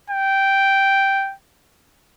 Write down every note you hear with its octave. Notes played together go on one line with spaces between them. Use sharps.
G5